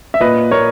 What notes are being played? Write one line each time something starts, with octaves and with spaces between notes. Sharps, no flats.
E5
A#2 B4 D#5
A#2 A#4 C#5